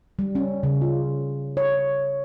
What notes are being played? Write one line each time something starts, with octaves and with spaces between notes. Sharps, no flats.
G3
C#4
C#3
F4
C#5